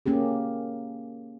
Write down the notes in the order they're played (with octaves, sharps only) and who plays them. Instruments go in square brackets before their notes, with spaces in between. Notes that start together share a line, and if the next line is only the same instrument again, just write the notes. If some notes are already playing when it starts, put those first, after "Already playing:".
[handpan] A#3 C#4 G4 G#4